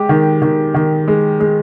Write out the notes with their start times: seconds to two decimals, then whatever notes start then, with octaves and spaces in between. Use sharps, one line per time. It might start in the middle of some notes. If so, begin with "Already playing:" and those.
Already playing: G#3 G4
0.09 D#3
0.42 D#3
0.74 D#3
1.08 G#3
1.40 G#3